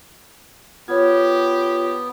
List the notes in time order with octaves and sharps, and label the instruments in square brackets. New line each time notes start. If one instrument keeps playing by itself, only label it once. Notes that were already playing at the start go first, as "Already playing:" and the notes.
[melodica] B3 [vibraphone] F4 [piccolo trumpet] G4 [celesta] C#5 G#6